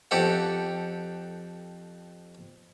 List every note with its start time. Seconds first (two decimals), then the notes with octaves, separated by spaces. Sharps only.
0.11 F2 G4 A4 F#5